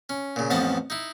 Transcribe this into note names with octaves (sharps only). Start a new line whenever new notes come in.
C#4
A#2 C#3
A1 F2 F3 B3 D#5 A5
D#4 E4